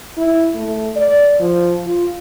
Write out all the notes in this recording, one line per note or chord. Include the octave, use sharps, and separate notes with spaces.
E4
A3
D5
F3
F4